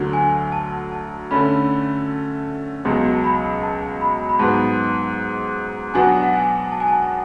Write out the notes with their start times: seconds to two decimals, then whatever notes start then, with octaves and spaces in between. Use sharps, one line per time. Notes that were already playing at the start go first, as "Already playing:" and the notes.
Already playing: D2 D3 F#3
0.13 G#5
0.52 A5
0.91 A5
1.31 D3 A3 C#4 B5
2.85 C#2 B2 F#3
3.14 A5
3.24 B5
3.63 A5
4.01 B5
4.29 B5
4.39 G#2 F#3 B3 A5
5.94 B2 F#3 B3 D4 F#4 G#5
6.23 F#5
6.34 G#5
6.72 A5
6.80 G#5
6.88 A5